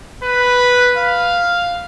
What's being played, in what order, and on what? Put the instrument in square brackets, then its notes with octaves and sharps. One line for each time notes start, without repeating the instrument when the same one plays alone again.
[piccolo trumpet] B4
F5